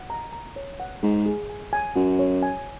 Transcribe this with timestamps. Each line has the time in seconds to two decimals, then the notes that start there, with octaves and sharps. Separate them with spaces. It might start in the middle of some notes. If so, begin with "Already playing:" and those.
Already playing: F#5
0.10 A#5
0.33 A#5
0.56 C#5
0.80 F#5
1.03 G#2 G#4
1.26 G#4
1.49 G#5
1.73 G#5
1.96 F#2 F#4
2.19 C#5
2.43 G#5